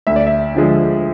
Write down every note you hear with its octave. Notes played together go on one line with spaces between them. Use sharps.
D2 E5
D5
E5
D3 F3 G#3